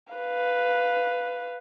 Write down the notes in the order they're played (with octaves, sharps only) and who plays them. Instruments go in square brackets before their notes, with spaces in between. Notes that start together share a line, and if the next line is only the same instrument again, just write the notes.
[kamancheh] B4 F5